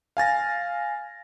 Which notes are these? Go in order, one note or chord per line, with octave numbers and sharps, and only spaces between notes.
F5 G#5 A6 A#6